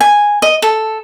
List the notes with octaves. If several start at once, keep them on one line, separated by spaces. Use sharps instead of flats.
G#5
D#5
A4